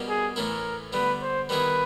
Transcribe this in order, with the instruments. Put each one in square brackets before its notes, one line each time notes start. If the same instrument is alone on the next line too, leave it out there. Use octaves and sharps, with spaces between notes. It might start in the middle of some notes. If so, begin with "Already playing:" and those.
Already playing: [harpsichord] B2 G3 A#3 C#4
[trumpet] G#4
[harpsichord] A2 E3 A3 C#4 E4 [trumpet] A#4
[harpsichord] D3 G3 B3 [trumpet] B4
[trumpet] C5
[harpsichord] D#3 G3 B3 E4 G#4 [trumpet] B4